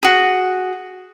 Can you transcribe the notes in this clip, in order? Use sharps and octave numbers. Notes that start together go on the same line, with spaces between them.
F#4 G#4